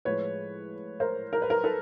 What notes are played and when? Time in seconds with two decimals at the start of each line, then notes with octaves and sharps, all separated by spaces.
0.05 A2 F3 G#3 B4 C#5
1.00 A#4 C5
1.33 A#4
1.42 B4
1.50 A#4
1.64 A4 B4